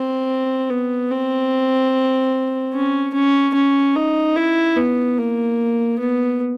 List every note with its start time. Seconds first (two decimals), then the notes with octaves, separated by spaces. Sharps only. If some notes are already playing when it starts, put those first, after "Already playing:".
Already playing: C4
0.70 B3
1.11 C4
2.74 C#4
3.14 C#4
3.54 C#4
3.96 D#4
4.36 E4
4.77 B3
5.18 A#3
5.99 B3